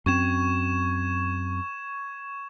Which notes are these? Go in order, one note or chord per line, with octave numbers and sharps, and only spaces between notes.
F#2 C4 C#6 G#6 E7